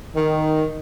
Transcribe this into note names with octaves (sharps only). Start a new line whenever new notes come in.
D#3